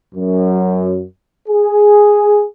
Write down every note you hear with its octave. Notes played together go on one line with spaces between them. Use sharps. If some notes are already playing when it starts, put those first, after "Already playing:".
F#2
G#4